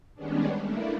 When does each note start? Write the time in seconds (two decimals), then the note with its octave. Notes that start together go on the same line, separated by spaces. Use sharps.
0.15 D#3 G3 G#3 B3 C#4 D4
0.63 A3 A#3 D4 E4